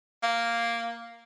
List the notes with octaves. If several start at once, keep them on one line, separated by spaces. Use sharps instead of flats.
A#3